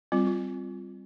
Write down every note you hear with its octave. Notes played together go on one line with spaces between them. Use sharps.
G3 C4 F4
F4